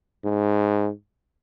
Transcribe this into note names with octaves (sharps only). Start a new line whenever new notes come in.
G#2